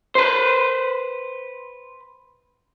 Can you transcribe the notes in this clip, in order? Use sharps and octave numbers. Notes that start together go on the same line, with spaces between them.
B4 C5